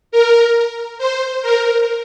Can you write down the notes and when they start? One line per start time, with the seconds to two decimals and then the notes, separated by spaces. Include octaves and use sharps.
0.12 A#4
0.98 C5
1.42 A#4